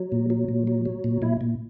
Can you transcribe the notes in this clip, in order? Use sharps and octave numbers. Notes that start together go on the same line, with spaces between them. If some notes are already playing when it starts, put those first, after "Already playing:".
Already playing: F#3
A#2
F#3
A#2
F#3
F#3
A#2
A#2 E4
A#2